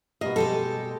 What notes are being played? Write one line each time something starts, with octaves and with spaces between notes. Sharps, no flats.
B2 G3 A#3 D#5
G#3 G4 A4